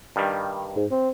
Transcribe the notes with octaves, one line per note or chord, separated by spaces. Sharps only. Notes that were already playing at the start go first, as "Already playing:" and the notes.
G2 D#3 G3
G#2
C4